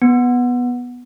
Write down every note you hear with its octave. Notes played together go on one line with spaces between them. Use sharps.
B3